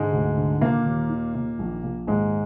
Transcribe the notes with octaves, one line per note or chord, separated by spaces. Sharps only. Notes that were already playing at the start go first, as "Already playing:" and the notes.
Already playing: G#2 D3 G#3
D2
D3
A#2 D#3 A#3
D#2
D#3
A#2
A#1
A#2
D#2 G#2 G#3